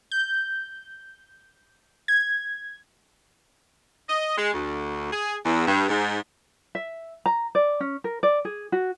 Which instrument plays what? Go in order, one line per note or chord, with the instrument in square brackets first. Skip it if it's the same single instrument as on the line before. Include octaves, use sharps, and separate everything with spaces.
[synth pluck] G6
G#6
[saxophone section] D#5
G#3
D2
G#4
E2
G2
G#2
[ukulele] E5
A#5
D5
C#4
A#4
D5
G#4
F#4